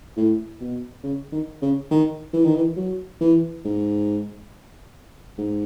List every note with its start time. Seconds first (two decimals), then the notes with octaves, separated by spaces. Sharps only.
0.17 A2
0.61 B2
1.04 C#3
1.32 D#3
1.62 C#3
1.91 D#3
2.33 E3
2.45 D#3
2.56 E3
2.77 F#3
3.21 E3
3.65 G#2
5.38 G#2